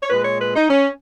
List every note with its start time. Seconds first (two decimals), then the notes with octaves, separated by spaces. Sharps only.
0.02 C#5
0.10 A#2 G#3 B4
0.25 C#5
0.40 B4
0.56 D#4
0.70 C#4